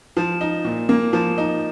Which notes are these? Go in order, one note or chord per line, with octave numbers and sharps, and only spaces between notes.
F3
D#4
A#2
A#3
F3
D#4